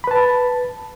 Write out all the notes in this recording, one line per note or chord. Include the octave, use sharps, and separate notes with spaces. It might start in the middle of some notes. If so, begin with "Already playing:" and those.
B4 A5 B5